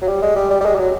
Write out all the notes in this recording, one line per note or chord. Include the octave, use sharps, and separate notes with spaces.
F#3
G3
G#3
G3
G3
G3
G#3
G3
F#3